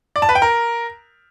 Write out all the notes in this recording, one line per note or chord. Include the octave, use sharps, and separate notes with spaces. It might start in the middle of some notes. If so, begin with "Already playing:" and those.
D5
A5
B4
G5
A#4